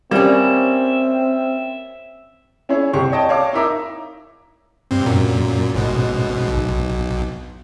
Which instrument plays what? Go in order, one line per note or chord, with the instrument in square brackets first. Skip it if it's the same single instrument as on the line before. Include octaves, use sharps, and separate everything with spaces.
[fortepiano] G3 [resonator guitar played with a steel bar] A#3 C#4 [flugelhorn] C4 [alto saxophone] E5
[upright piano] C#4 E4 G#4 C#5
C2 C4 G4 C#6
C#5 D#5 G5 A5
C#5 F5 A5 D6
D#4 E4 A#4 E5 A#5 D6
[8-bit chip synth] G2 C4
F#2 A#2
A1 G#2 B2
B1